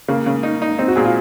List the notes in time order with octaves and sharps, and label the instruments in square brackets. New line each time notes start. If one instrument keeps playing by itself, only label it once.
[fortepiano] C#3 [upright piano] A#3
[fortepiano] C#3
D#4
D#4
[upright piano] C4 [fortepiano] D#4
[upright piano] F#4
[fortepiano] A#2 [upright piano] G#4
[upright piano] F4